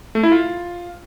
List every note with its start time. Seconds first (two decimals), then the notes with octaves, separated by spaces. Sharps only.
0.15 A3
0.23 E4
0.32 F4